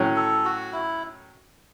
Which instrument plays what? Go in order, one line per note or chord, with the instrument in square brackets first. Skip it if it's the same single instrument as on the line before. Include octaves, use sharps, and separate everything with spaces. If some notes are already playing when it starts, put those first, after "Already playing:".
Already playing: [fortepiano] A2 F#3 C#4
[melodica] A4
F#4
E4